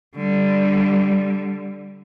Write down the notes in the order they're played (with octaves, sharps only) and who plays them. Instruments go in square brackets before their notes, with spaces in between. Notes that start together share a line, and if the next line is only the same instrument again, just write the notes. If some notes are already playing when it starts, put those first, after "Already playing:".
[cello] D3 G3